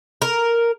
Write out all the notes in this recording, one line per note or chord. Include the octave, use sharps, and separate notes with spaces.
A#4